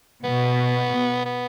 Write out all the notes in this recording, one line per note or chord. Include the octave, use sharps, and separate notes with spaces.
B2 B3
B3